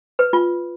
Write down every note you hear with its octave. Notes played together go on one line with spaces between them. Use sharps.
B4
F4